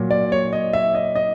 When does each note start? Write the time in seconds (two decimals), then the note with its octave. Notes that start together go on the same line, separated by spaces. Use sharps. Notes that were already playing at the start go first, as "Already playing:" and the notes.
Already playing: A#2 F#3 A#3
0.11 D5
0.32 C#5
0.53 D#5
0.73 E5
0.95 D#5
1.15 D#5